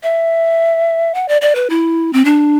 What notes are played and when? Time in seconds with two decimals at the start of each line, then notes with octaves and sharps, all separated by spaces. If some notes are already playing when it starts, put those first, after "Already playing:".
0.03 E5
1.14 F#5
1.28 D5
1.41 D5
1.55 B4
1.70 E4
2.13 C4
2.25 D4